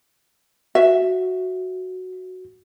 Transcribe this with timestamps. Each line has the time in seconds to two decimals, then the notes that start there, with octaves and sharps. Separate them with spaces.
0.75 F#4 E5